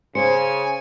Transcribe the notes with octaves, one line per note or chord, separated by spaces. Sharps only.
C#3 C5 G#5 C#7